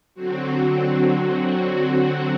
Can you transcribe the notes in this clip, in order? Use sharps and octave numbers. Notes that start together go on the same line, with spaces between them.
D3 F#3 C4 F#4